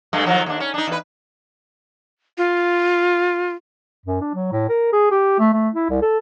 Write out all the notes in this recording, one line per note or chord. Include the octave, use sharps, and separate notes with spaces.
G2 G#3 A3
D#3 F3 F#3
D#2 D4
C#4
D4 D#4
E2 B4
F4
F#2
D4
F#3
A2
A#4
G#4
G4
A3
A3
E4
C2
A4